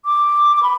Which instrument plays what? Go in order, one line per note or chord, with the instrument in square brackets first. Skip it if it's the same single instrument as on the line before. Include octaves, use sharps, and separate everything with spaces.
[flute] D6
D6
B5